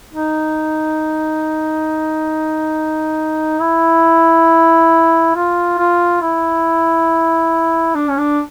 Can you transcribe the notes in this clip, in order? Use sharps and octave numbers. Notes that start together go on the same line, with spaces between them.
D#4
E4
F4
F4
E4
D4
C#4
D4